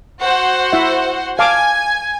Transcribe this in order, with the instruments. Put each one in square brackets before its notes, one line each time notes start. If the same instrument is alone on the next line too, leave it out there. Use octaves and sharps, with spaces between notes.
[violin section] F#4 C5 F#5
[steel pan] E4 E5
[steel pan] F5 A5 D6 [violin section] G#5